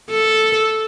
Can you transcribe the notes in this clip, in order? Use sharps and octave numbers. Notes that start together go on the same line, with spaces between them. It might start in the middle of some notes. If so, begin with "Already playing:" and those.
A4